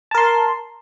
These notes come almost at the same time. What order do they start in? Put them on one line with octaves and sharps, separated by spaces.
A5 A#4 C6